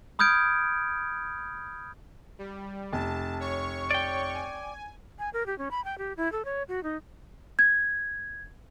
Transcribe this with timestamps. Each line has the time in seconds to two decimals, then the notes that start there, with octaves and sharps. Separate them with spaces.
0.19 B5 D#6 F6 G6 G#6 D7
2.39 G3
2.92 F1 A5
3.40 C#5 C#6
3.91 D5 G5
4.34 G#5
5.19 G#5
5.33 A#4
5.46 G4
5.58 C#4
5.71 B5
5.84 G5
5.98 G4
6.17 E4
6.32 A4
6.45 C#5
6.68 F#4
6.83 D#4
7.59 G#6